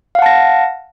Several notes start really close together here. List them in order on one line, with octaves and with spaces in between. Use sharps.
F5 F#5 A5 A#6